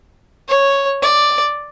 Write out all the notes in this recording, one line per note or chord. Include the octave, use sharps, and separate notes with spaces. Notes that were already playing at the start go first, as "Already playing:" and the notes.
C#5
D5